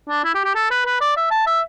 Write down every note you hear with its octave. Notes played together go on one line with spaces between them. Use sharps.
D4
E4
G4
G4
A4
B4
B4
D5
E5
A5
E5